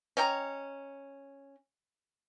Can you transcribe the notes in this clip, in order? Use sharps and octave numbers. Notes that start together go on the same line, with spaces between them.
C#4 D#5 G5 A#5